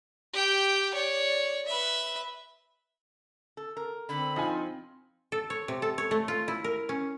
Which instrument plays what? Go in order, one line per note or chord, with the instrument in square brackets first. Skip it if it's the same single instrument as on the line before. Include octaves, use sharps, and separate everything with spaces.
[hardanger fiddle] G4 G5
C#5 D5
B4 E5
[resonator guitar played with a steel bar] A4
A#4
[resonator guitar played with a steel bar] D3 [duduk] C4 [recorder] B5
[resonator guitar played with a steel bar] F3 [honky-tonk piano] D#4 F4 G#5
[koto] A4
C#5
C3
A4
C#5
A3
F4
E4
A#4
C#4